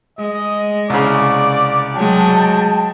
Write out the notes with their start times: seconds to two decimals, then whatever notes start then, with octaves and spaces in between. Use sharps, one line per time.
0.19 G#3 D#5
0.90 C2 C#3 D5
1.94 F#3 G#3 G5 A5